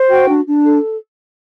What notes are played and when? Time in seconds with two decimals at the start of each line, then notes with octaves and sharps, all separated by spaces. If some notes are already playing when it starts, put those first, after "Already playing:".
Already playing: C5
0.10 F#4 G5
0.27 D4
0.46 D4
0.64 A4